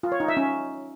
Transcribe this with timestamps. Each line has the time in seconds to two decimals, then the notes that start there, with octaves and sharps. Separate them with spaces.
0.03 F4
0.12 C#5
0.20 D#4
0.28 E5
0.37 C#4